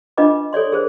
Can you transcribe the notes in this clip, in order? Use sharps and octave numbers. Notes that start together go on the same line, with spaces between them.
D4 F4 B4 D#5 A#5 D6
A4 C#5 D5 C6
G#4 A#4 C5